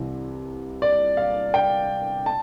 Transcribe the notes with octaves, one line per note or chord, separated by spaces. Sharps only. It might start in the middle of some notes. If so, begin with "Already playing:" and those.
Already playing: C2 C3 E3
D5
F5
G5
A5